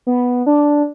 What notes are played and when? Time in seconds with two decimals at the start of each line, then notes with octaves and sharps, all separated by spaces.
0.07 B3
0.46 D4